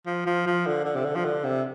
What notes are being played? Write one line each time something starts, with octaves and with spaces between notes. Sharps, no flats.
F3
F3
F3
D3
D3
C3
D3
F3
D3
C3